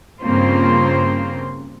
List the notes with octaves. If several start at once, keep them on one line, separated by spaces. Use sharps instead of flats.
G2 C#3 A#3 C4 F4 C5